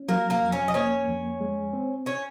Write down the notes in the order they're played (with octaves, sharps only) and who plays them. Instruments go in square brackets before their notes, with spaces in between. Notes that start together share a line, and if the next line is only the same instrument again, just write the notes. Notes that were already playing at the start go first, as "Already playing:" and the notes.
Already playing: [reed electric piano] C#4
[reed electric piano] F#3 [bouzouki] A#3 A#4
[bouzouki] A#3 A#4
[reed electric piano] F2
[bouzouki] C#4 C#5
D#5
[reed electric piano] A#3 [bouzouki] C#4 C#5
[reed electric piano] F2
G#3
C4
[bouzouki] C#4 C#5